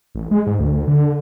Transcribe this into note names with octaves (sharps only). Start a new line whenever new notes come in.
A1
G#3
G#2
D2
D3